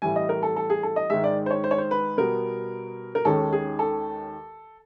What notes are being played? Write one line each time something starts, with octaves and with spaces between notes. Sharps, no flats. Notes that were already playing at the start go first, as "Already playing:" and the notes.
A2 E3 G3 G#5
D#5
A#4
A4
A4
G#4
A4
D#5
G#2 D#3 G#3 E5
D5
C5
C#5
C5
C#5
C5
B4
B2 G3 B3 A#4
A#4
D#2 D#3 G#3 C#4 A4
G#4
A4